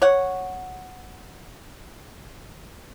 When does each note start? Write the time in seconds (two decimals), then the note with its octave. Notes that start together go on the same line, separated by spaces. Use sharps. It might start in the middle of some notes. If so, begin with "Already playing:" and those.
0.02 C#5 F#5